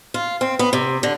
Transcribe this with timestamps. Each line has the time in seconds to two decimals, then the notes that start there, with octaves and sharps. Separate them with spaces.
0.14 F4
0.41 C4
0.59 B3
0.73 C3
1.03 D3